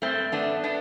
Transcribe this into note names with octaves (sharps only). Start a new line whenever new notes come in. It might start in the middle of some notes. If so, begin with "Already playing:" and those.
G2 A3 C4
A3 B3 D4
B3 D4